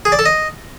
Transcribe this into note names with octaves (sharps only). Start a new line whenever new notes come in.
G#4
D5
A4
D#5